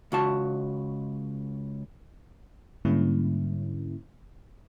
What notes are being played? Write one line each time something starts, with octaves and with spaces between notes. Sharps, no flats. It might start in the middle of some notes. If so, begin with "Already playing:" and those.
C#2 F#4 A5
G#2 D3 G3 A#3 C#4 E4